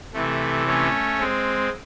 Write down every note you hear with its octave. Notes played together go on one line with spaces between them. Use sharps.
C3 E3 A3
A3 C#4
G#3 C4